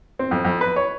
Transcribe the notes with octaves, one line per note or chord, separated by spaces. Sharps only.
C4
F2
F2
B4
C#5